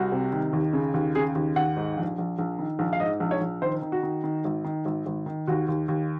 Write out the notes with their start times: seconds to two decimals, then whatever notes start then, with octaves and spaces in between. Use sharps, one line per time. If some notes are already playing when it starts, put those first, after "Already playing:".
Already playing: C2 F#4
0.12 C3
0.32 D#3
0.53 D#2
0.73 C#3
0.94 D#2
1.15 C#3 G#4
1.35 D#2
1.56 D#2 F#5
1.77 G#2
1.97 A#1
2.18 A#1
2.39 A#1
2.59 D#3
2.79 A#1
2.93 F5
3.00 G#2 D#5
3.20 A#1
3.31 C#5
3.41 A#1
3.62 D#3 C5
3.82 D#3
3.92 F#4
4.03 D#3
4.24 D#3
4.45 G#1
4.64 D#3
4.85 G#1
5.06 G#1
5.26 D#3
5.47 D#2 F#4
5.68 D#2
5.88 D#2